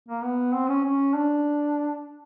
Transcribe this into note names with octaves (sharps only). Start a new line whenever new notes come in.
A#3
B3
C4
C#4
C#4
D4